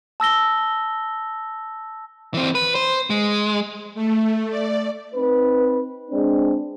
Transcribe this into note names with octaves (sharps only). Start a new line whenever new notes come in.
A5 E6 A#6 G7
E3 C4
B4
C5
G#3
A3
D5
C4 D#4 B4
G#3 C4 D4